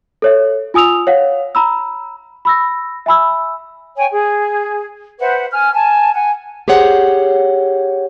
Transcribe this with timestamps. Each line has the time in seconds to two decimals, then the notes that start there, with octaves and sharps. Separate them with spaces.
0.22 A4 C#5 E5
0.74 F4 G#5 D#6 E6 F7
1.07 C#5 F5 F#5
1.55 A#5 B5 E6
2.45 B5 E6 A#6
3.06 E5 G#5 B5 E6
3.97 C#5 G5 G#5
4.11 G#4
5.19 B4 C5 E5 F#5
5.52 G#5 F6
5.74 G#5 A5
6.15 F#5 G#5
6.68 G4 G#4 C5 C#5 F#5